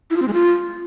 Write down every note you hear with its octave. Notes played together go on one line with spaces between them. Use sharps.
E4
F4
C4
G#3
F4